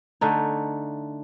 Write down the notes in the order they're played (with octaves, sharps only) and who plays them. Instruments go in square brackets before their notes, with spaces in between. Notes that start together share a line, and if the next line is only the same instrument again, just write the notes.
[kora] D3 A3 D#4